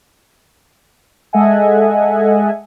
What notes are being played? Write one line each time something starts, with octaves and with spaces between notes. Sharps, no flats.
G#3 A4 D#5 E5 F#5 G#5